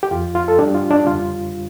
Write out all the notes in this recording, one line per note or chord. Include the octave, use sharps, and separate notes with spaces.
G4
F2 F3 F4
F4
A4
G2 G3 D4 G4
F4
D4
F2 D3 G3 F4